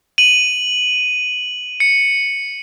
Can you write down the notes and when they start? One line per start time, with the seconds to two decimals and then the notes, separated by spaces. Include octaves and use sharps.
0.18 D#7 F#7
1.80 C#7